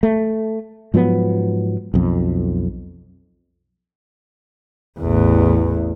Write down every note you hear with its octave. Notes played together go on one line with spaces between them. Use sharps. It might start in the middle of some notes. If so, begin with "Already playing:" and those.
A3
G#2 F3 F#3 B3
B1 F2
A1 E2